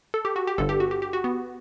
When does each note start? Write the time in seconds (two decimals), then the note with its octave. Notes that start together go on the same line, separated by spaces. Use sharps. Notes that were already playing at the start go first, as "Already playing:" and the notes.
0.14 A4
0.25 G4
0.36 F#4
0.47 G4
0.58 G1 G2 D3 A4
0.69 G4
0.80 F#4
0.91 G4
1.02 G4
1.13 F#4
1.24 B3